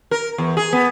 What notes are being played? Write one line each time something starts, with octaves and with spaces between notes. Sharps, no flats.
A#4
E2
G#4
B3